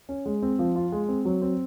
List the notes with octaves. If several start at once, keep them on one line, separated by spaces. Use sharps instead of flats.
C#4
G#3
C4
F3
F4
G#3
C4
F#3
C4